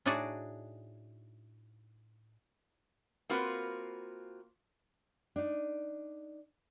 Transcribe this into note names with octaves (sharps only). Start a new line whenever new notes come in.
A2 D4 D#4 F#4 G#4 D5
A#3 C4 F4 F#4 B4
D4 D#4